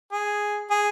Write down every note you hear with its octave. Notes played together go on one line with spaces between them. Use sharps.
G#4
G#4